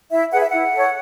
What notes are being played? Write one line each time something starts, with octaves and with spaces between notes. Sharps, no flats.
E4 E5
G#4 B4 F#5
E5
E4 F#5
A4 C#5